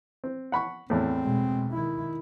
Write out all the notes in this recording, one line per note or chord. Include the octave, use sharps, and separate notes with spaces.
C4
F#5 B5 C#6
E2 A2 C4
B2 G#3
D#3 E4